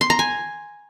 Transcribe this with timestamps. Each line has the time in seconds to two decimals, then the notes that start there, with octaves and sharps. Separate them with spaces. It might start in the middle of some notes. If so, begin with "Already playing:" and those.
0.01 C6
0.10 A#5
0.19 G#5